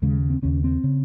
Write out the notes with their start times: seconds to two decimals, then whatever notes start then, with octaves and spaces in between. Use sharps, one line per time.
0.02 D#2 C#3 G#3
0.30 C4
0.42 D#2 C#3 C#4
0.64 C4
0.84 C#3